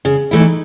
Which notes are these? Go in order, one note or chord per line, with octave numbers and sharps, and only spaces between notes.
C#3 G#4
E3 A3 E4
D#4